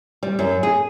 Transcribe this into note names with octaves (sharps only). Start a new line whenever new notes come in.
G3
F#2
G#4